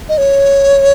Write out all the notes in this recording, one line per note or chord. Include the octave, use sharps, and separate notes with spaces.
D#5
C#5